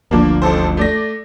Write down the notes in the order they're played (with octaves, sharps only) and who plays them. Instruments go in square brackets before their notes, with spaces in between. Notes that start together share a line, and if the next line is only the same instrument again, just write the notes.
[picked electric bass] G1 D2 F3 [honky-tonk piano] A#3 D4
[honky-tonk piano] A1 A4 C5
A3 D5 A#6